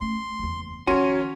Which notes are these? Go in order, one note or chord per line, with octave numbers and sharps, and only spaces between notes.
A3 C#4 C6
F#1 E2
D#3 F3 C#4 F#4 A#4 C#5 C6 D#7